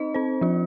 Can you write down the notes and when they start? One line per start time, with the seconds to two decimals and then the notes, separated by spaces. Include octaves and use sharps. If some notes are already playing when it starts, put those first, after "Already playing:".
Already playing: C4 D#4 D#5
0.14 C4 C5
0.41 F3 F4